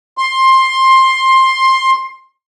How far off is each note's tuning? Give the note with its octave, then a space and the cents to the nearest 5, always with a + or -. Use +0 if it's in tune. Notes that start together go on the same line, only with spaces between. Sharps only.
C6 +15